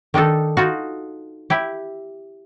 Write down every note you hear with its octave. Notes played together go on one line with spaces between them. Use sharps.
D#3 D4 D#4 A4
D#4 F4 F#4
E4 G4